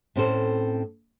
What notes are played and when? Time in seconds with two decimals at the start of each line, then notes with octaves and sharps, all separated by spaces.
0.16 A2 C4 C#4 E4 A4 C5